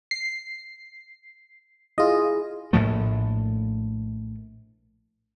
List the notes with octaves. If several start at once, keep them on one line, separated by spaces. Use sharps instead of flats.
C7
E4 F4 G#4 D#5
A#1 A2 F3 A3